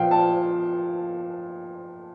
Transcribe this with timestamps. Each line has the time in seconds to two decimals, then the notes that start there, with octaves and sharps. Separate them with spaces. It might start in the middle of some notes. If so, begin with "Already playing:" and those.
Already playing: A#2 F3 F5 G5
0.11 A5